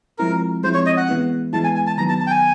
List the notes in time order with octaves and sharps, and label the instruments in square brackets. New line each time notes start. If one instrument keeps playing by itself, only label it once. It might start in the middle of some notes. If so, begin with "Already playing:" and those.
[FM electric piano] F3 G#3 C4 E4 [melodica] A#4
[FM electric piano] F3 G#3 C4 E4 [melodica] C5
[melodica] C#5
D#5
F#5
[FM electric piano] E3 G#3 B3 E4
[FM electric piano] E3 G#3 B3 E4 [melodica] A5
[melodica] G#5
G#5
A5
[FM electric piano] D#3 F#3 B3 [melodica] A#5
[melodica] A5
A5
G5
G#5